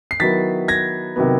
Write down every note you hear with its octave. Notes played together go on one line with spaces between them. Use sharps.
C7
D#3 F#3 B3 E4 A6 B6
G#6 A#6
C3 D#3 F#3 B3